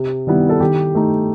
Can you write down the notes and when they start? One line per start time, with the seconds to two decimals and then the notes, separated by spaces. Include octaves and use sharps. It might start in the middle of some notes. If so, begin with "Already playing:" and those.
Already playing: C3
0.27 D#3 G3 B3 E4
0.49 A4
0.60 D#3 G4
0.95 A3 D#4